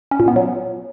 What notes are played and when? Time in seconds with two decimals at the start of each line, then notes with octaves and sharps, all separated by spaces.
0.11 C#4
0.20 A#2
0.28 B3
0.36 F#3